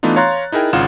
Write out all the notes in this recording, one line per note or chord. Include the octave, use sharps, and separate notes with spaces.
E3 A3 B3 D4 D#4 F4
C#5 F5 A#5 C6 F#6 A6
D#4 E4 G#4 A#4 G5
G#1 C#3 F4 F#5 F6 E7